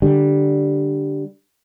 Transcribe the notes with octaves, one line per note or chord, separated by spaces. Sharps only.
D3 G3